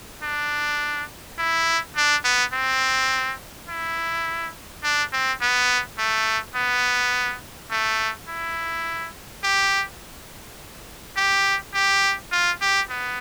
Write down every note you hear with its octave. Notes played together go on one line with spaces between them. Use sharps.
D4
E4
D4
B3
C4
E4
D4
C4
B3
A3
B3
A3
E4
G4
G4
G4
F4
G4
B3